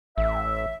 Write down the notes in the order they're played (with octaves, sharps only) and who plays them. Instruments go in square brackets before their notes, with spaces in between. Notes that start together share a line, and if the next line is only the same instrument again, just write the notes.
[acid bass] A1 [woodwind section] E5